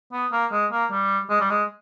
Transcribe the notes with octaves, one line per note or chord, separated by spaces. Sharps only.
B3
A#3
G#3
A#3
G3
G#3
G3
G#3